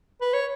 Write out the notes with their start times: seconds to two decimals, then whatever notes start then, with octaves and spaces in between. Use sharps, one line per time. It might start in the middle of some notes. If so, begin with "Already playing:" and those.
0.21 B4
0.33 C#5